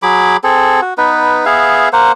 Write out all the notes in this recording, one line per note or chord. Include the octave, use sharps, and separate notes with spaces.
F#3 G#4 B5 D6
C4 G#4 A4
F#4
B3 D#4 B4
B3 G#4 E5 F5
A#3 C5 F#5